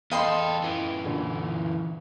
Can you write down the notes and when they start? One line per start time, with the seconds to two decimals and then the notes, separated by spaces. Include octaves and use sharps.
0.11 E2 A4 D#5 F5 G5 B5 C6
0.62 F#2 E3
1.05 A#2 D3